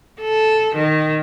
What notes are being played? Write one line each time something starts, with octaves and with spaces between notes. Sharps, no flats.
A4
D#3